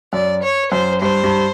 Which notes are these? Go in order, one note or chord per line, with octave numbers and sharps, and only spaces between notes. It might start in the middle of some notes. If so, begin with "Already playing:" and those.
F#2 D5
C#5
F#2 C5
G2 C5
G2